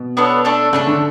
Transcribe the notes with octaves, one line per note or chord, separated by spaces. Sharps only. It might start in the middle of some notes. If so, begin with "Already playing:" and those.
Already playing: B2
B3 D4 A4 C#5
A3 D4 A4
C#3 A3 D4 A4
D3